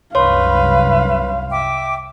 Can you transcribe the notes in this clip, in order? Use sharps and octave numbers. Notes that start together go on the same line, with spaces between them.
C2 F#2 B4 C#5 F5 C6
E5 G5 D6